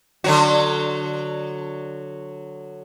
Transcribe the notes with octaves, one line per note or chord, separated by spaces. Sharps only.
D3 F#3 F#4